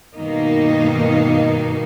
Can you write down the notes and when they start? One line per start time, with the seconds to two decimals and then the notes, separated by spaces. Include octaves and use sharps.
0.16 G2 B2 D#3 A#3 D#4